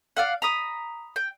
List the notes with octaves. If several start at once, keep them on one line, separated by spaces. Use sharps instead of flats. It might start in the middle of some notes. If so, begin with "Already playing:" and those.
D5 F5 F#5
A#5 B5 D#6
G5